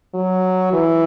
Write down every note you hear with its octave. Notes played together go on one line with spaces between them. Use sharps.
F#3
E3